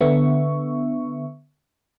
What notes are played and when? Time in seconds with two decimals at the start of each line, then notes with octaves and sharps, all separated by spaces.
0.01 D3 B3 E5 C#6